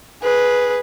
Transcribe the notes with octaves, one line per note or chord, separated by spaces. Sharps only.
G#4 B4